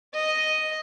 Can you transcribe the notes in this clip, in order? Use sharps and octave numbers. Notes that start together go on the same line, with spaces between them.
D#5